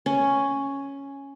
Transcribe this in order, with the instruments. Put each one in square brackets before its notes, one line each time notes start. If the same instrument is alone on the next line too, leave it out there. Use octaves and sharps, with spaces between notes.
[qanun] C#4